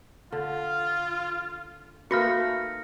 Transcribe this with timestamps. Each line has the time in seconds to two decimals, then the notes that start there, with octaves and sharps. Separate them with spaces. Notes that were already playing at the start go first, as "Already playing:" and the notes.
0.32 D3 F4
2.11 A3 A#3 D#4 F#4 B4 F6 A#6 C#7